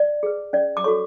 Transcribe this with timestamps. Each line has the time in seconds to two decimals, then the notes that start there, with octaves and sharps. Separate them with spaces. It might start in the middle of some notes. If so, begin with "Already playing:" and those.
Already playing: D5
0.23 G#4 B4
0.53 C#4 D5
0.77 D6
0.84 F#4 A4 C#5 C#6